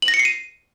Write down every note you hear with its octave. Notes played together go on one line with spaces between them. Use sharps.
F#7
A#6
C#7
C7
D#7